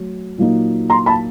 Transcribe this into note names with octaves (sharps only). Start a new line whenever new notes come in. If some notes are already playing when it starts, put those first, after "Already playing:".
Already playing: F#3 A3
A#2 F#3 A#3 D#4
A#5 C6
A5 B5